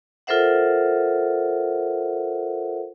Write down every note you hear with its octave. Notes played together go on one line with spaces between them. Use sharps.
F4 A4 A#4 C5 E5 F#5